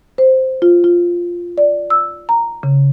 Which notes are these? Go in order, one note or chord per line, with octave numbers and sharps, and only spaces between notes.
C5
F4
F4
D5
E6
A#5
C#3